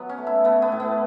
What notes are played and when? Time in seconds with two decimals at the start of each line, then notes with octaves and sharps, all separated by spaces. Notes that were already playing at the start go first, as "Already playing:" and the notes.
Already playing: F#3 B3 B4
0.09 C#4
0.18 A3
0.27 E4
0.44 A3 B3
0.62 B3
0.72 A2
0.80 B3